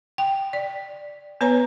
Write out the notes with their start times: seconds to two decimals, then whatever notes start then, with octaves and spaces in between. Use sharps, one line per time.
0.18 G5
0.53 D5
1.41 B3 B4 C#5 A#5